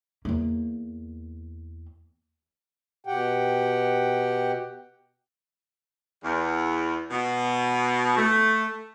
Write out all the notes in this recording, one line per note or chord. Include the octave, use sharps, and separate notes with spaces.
E2 A#3
B2 G4 F#5 G5
E2
B2
A3